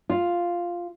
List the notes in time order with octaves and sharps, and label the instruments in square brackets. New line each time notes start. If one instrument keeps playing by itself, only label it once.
[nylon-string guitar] F4